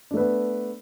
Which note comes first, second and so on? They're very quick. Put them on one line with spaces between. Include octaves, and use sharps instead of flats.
D4 A3 B4 B3